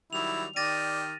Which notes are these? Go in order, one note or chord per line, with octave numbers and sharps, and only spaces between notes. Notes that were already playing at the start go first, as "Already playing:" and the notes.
D#3 F#3 G3 E4 F7
D#3 G4 D5 F6 A6 A#6 D#7